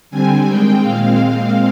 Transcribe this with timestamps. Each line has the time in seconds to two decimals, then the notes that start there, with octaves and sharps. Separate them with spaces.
0.11 D3 G3 C4 G#5
0.46 D#3 G#3 C4 G5
0.82 A#2 G#3 C4 F5